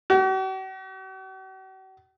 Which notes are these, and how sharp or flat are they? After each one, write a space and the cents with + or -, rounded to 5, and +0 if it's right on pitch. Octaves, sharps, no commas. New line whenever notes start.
F#4 +45